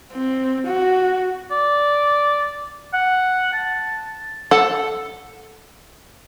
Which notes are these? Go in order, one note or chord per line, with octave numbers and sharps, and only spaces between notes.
C4
F#4
D5
F#5
A5
A4 F#5